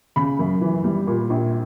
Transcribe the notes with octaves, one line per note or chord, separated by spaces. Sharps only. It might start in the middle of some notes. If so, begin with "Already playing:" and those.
C#3 B5
F#2
E3
G3
A#2
A#1